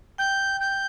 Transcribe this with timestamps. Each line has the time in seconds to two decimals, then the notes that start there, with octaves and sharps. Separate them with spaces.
0.18 G5 G6
0.60 G6